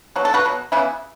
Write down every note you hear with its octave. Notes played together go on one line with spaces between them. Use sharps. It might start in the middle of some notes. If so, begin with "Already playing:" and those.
B2 F#3
A4
F#4 B4
B2 F#3
C#3 E3 B3 E4